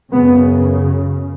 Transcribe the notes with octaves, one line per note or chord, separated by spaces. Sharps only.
F#2 C#3 B3